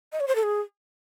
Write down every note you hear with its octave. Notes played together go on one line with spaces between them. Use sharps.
D#5
C#5
C5
A4
G#4